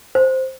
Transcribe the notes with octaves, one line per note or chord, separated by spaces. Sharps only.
C5